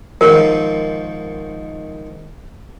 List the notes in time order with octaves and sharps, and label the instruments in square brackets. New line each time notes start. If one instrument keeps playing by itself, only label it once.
[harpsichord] G#2 D#3 F3 [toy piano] A#4